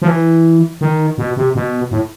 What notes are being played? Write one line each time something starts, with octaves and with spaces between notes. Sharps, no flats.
F3
E3
D#3
B2
C3
B2
A2